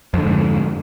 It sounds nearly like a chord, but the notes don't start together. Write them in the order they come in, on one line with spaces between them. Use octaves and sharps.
F2 D3 G#2